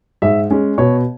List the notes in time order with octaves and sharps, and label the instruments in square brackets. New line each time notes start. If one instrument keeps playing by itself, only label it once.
[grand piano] G#2 E5
G#3 C#4
B2 C#5